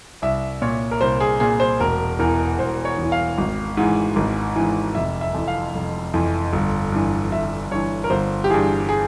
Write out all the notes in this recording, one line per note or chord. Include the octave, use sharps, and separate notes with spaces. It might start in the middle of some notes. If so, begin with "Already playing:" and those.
C2 E5
A#2 C#5
A#4
C2 C5
G#4
A#2 G#4
C5
E1 A#4
E2 E3 A#4
E1 C5
C#5
E2
E3
F5
G#1
G#2 E3
G#1
G#2 E3
F1 E5
E5
F2 E3
F5
F1
F2 E3
G1
G2 E3
G1 E5
G2 E3 C#5
A#4
G1 C5
G4
G2 E3 G#4
G#4